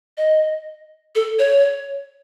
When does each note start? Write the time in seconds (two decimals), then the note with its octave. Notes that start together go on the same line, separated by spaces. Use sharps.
0.17 D#5
1.15 A4
1.39 C#5